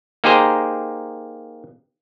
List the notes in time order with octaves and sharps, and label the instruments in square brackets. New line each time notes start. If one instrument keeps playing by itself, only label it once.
[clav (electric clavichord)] A#3 D#4 G4 G#4 C5 A#5